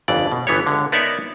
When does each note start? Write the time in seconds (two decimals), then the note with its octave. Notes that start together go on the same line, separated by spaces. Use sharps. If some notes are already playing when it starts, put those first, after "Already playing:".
0.08 G1 F2 E3 D5
0.31 B2
0.47 G1 E3 B3 G4 C#5
0.67 C#2 D3
0.92 B3 D#4 A#4 C#5 D5 E5